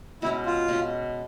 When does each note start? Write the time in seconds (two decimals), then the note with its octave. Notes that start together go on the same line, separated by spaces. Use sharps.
0.22 B2 G#3 C#4 E4
0.46 F4
0.68 B2 G#3 C#4